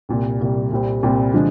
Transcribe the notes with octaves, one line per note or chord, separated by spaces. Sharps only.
C2 A#2 G3
C2 A#2 G3
C2 A#2 G3 C4
C2 A#2 G3 C4
D3 F3 G#3 D4